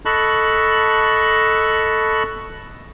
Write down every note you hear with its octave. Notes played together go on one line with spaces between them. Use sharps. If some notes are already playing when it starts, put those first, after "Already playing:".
A4 D#5 A5 B5 C#6 F#6